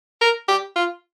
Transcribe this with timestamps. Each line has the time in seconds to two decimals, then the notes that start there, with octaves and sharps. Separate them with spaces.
0.21 A#4
0.48 G4
0.76 F4